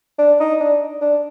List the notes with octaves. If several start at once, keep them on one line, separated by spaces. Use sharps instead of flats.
D4
D#4
D4
D4